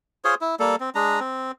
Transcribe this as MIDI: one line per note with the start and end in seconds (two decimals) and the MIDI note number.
0.25 0.35 65
0.25 0.35 68
0.25 0.35 72
0.25 0.35 73
0.41 0.55 64
0.60 0.76 55
0.60 0.76 58
0.60 0.76 69
0.80 0.90 60
0.95 1.20 56
0.95 1.20 62
0.95 1.20 82
1.20 1.52 60